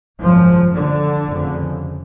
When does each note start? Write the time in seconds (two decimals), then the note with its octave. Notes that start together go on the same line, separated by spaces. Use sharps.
0.20 G#1 F#2 C#3 F3
0.73 D3
1.26 F1 F2 C#3